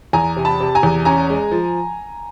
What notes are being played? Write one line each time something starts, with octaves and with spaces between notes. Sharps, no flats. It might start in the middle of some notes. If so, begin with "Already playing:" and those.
E2 G#5 A#5
C3
A5 B5
C3
G#5 A#5
E2
C#4 G#5 A#5
G#3
F3